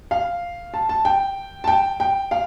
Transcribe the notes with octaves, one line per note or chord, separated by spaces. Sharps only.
F5
A5
A5
G5
A5
G5
G5
F5